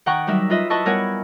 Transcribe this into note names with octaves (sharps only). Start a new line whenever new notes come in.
D#3 F#5 G5 A#5 C#6
F#3 G3 D#4 A#4 E5
F4 B4 D#5 E5
E4 B4 D#5 A5 C#6 E6
G3 B3 A#4 C#5 F#5 G#5